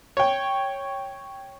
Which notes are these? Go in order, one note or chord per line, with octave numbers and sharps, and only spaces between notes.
C#5 G5